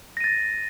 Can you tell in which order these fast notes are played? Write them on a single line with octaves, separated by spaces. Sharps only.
A#6 D#7 A6